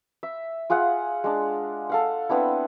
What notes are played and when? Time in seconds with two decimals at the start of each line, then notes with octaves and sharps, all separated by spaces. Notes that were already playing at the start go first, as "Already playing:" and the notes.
0.23 E5
0.70 F4 G#4 F5 F#5
1.24 G#3 D4
1.90 A4 F5 F#5
2.29 B3 C4 D4 E4